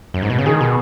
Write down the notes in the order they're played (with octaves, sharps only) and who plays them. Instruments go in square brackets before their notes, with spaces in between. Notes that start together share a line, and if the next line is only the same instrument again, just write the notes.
[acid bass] F#2
G#2
B2
C#3
[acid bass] D#3 [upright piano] G#4
[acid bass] B2